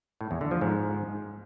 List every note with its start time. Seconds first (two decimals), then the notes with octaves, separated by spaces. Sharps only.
0.21 A2
0.31 E2
0.41 D3
0.51 F3
0.61 G#2